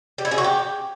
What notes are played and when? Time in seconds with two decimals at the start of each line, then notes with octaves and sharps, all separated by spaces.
0.18 G4
0.25 E4
0.31 G#4
0.38 F#4
0.44 G4